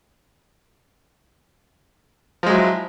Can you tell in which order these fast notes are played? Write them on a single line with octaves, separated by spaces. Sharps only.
F3 G#3 F#3 E4